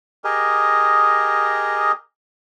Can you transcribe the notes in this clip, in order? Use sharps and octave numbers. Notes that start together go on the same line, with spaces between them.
G4 G#4 A#4 D#5